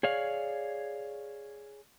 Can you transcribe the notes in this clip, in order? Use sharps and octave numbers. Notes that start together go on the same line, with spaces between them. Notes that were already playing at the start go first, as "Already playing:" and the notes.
G#4 C#5 D5 F5